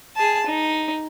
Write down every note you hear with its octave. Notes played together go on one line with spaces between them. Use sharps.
G#4 A5
D#4